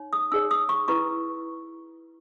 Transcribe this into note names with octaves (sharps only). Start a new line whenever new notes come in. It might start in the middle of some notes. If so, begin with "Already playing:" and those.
Already playing: D#4 C#5
D#6
D#4 G#4 C#5 E6
D#6
C#6
E4 B4 C#6